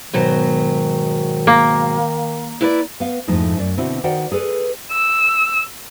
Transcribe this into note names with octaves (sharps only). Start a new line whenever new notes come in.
G#2 B2 D#3 F#3
A#3
E4 B4 D5
B3 F5
F2 G#2 F3 A3 D#4 E4
F#2 D5
B2 D3 C4 E4 F#4
D#3 F#4 C5 D5 F#5 G5
G#4 A4 B4
E6